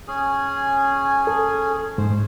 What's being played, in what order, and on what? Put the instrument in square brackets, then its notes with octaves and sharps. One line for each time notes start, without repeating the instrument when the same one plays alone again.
[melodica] C#4 G#4 G#5
[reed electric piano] A4
[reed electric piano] G#2 [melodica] C5